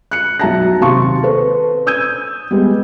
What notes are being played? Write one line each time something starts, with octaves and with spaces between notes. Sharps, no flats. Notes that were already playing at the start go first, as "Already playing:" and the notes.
F#6 C#7
B1 F#3 E5 A5 A#5 A#6
D#2 C3 F5 A5 C6 C#6
A4 B4 C5
D#6 E6 G6 G#6 D#7
G3 G#3 B3